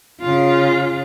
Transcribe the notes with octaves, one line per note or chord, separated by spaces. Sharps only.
C#3 F4